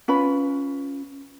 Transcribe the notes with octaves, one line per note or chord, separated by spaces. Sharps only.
C#4 F4 B4 B5